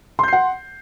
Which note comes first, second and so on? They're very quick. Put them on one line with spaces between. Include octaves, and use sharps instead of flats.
C6 G6 C7 F#5